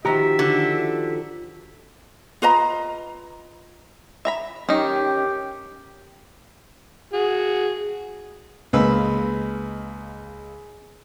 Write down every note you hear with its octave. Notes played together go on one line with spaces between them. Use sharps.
D#3 F3 F#4 G4 E5 A#5
D3
F4 B4 D#5 A#5
E5 A#5 B5
D#3 C#4 D#4 G4
F#4 G#4
C#2 A#3 B4 D#5 E6